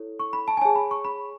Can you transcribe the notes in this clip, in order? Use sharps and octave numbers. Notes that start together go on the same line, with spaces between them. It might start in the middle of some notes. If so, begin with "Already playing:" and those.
Already playing: E4 A4 C#5
C#6
B5
A5
G#5
G#4 C#5 A5
B5
C#6
B5